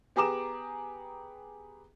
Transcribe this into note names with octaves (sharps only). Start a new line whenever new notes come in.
B3 G4 G#4 A#5 D6 E7